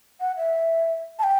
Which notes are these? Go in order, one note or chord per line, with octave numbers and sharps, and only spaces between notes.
F#5
E5
A5
G5